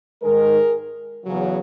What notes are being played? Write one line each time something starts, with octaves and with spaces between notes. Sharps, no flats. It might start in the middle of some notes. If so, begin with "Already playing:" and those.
G#2 D#3 G#3 G#4 A#4
E2 C#3 F#3